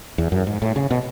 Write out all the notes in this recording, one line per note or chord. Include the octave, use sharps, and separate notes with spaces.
E2
F#2
G#2
A2
C#3
B2